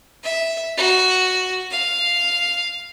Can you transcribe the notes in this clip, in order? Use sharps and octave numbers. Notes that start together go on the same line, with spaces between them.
E5
F#4
F5